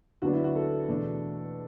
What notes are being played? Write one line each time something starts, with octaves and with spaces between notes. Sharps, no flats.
D2 D3 F#3 B3 D4 F#4
E4
F#4
A4
E2 B2 A3 D4